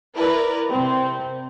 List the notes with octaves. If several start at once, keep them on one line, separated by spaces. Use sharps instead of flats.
E4 A#4 B4 D5
C3 C4